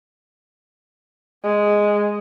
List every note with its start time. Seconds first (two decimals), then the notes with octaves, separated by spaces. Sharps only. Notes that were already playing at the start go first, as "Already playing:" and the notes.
1.44 G#3